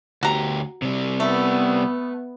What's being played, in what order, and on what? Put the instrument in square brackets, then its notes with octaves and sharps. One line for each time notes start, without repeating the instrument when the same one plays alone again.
[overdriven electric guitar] D2 G4 [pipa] F#4 A#5
[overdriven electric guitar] C3 G3
[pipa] A3 [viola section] B3